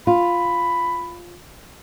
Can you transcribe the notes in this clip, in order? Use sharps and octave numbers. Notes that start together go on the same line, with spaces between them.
F4 B5